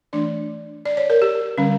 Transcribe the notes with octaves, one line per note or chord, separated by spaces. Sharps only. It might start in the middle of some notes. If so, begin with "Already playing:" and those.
E3 A3 D4 D5
D5
C#5
A#4
G4
D3 G3 C#4